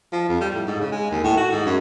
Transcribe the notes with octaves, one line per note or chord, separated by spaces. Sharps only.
F3
F2
G3
A2
G#2
C#3
G#3
D#2
A2
F#4
G#2
F#2